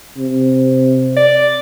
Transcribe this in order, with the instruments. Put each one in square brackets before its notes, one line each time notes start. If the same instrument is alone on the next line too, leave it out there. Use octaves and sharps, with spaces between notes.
[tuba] C3
[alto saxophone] D5